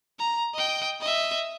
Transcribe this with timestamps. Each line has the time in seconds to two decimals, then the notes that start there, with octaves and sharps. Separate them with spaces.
0.19 A#5
0.54 D#5 G5
1.01 D#5 E5